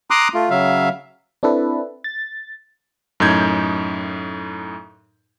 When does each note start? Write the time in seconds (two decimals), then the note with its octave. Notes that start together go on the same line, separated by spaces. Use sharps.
0.10 A#5 C6 D6 D#6 F#6
0.34 A3 F4
0.50 C#3 F#3 E5 F5
1.43 C4 D4 E4 A4 B4
2.04 A6
3.20 F#2 A2 D#4 G6 G#6